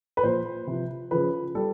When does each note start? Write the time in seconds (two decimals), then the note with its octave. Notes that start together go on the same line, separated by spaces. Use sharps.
0.17 B4
0.23 A#2 F3 C5
0.67 C3 F3
1.11 C#3 F3 B4
1.55 G3 A4